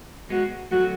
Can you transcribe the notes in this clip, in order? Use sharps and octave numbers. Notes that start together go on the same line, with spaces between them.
G#3 B3 F#4
F#3 A3 F#4